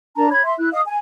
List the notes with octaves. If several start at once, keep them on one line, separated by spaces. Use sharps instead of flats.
D4 A#4 A5 A#5
C#5 B5 G#6
E5 C6
E4 F#6
D#5 F5 D#6
G#5